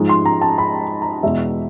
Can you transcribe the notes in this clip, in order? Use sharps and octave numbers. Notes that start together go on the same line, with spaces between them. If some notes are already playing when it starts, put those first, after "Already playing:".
Already playing: G#2 F3 G#3
C6
A#5
A5
B5
A#5
E2 B2 G#3 E5